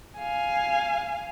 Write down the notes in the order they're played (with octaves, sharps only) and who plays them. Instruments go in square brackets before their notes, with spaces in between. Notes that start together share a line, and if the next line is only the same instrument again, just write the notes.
[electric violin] F5 G#5